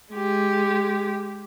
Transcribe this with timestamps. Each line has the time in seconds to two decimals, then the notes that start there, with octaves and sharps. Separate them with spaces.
0.13 G#3 G4